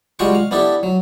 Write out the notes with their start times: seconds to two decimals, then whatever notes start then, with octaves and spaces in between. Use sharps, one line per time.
0.19 G3 G#3 F4 F#4 G5 C#6
0.35 F5
0.51 B3 D4 E4 G4 A4
0.83 F#3